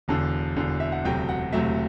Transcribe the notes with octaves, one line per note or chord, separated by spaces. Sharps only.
E1 E2 D3 A5
E1 E2 D3
E5
F#5
E1 D2 C3 F#3 A3 G5
F#5
E1 D2 C3 F#3 A3 E5